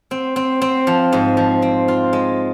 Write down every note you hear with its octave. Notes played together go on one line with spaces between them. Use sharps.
C4
C4
C4
F3
G#2
F3
C4
F4
G#3